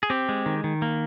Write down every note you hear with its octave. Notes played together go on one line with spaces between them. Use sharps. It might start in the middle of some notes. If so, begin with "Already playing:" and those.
G#4
C4 G4
G#3
D#3
D#3
A#3